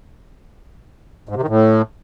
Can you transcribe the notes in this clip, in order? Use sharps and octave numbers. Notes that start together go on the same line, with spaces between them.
G#2
C3
D#3
A2